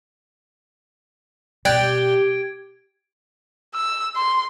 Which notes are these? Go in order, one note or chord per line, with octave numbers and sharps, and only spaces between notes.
B2 G3 G4 D5 G5 F#6 G#6 D7
E6
C6